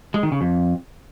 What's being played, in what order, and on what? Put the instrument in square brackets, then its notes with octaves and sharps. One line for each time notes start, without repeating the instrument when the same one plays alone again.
[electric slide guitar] G#3
D#3
C#3
F2